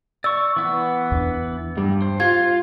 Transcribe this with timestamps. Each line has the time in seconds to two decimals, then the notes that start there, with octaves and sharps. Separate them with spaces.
0.24 D5 C#6 E6
0.56 E3 B3 B4
1.12 E2 D4
1.77 G2 G3
2.02 C5
2.20 F4 G#6